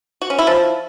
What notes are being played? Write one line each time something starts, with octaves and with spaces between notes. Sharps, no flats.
F#4
C#4
E4
F3